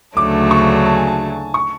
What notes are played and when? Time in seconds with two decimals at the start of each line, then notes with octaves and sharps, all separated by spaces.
0.17 D2 C#3 F#3 A3 D4 D6
0.51 C#6
0.86 A5
0.96 G#5
1.07 A5
1.54 C#6